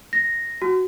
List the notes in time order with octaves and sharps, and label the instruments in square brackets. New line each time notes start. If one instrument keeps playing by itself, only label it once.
[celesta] A#6
F#4